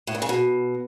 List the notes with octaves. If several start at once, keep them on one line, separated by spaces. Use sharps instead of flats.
A2
G2
C#3
B2